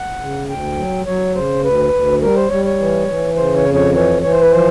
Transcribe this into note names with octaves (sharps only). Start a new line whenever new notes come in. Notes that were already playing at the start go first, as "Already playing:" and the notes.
Already playing: F#5
C#3
D2 G5
F#3
F#3 C#5
C#3 C5
D2 B4
D2
G3 A#4
C5
G3 C#5
C#5
E3
E3
C#3 C5
C#5
F2
C#5
E3 C#5
E3 C#5
C5
B4
F3 C5